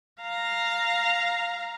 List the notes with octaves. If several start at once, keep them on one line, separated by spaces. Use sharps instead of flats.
F5 A#5